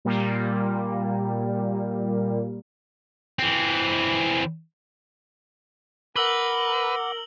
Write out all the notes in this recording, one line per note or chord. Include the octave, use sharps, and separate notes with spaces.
A#2 G3 A#3
E3 C4
A#4 B4 F#5 D6 E6 F#7 G7